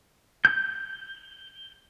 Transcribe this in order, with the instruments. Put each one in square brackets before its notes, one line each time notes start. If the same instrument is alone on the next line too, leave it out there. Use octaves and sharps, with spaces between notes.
[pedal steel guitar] G6